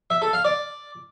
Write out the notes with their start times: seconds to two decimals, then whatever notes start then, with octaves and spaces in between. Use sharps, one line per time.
0.10 E5
0.22 A4
0.33 F5
0.45 D5